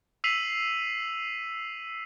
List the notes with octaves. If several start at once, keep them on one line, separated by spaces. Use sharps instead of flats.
E6 B6 C7 D#7 F7 F#7